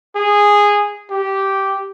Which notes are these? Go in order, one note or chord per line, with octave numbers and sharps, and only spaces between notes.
G#4
G4